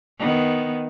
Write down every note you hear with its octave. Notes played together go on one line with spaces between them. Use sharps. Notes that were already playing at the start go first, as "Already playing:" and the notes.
D#3 B3